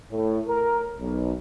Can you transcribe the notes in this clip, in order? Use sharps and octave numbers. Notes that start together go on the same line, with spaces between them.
A2
A#4
B1